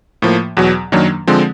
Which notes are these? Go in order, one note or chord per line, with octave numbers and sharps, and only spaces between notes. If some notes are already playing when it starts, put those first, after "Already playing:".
A2 F3 A#3
E2 B2 F#3
F#2 D#3 F#3 A#3 D4
D3 F3 G#3 C4